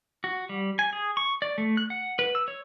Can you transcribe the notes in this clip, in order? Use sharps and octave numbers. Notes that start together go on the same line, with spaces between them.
F#4
G3
G#5
G#4
C#6
D5
A3
F#6
F#5
B4
E6
C#5